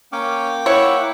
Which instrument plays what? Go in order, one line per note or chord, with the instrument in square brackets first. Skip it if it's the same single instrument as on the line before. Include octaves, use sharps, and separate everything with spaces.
[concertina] A#3 G5 D6 [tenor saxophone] C#4
[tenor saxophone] E4 [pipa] C#5 [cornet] F#5